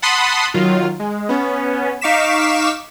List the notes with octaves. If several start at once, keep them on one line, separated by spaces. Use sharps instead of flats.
F#5 A5 B5 C6 D#6
D#3 F#3 F4
G#3
B3 C#4
D#4 F5 C#6 D6 B6 E7